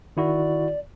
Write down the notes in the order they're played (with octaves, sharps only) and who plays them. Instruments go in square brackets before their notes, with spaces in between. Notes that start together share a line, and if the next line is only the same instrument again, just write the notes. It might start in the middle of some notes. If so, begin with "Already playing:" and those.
[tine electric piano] D#3 E4 F#4 [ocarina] D5